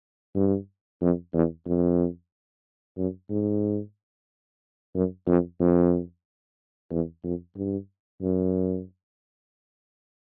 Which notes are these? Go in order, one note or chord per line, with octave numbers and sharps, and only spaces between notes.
G2
F2
E2
F2
F#2
G#2
F#2
F2
F2
E2
F2
G2
F#2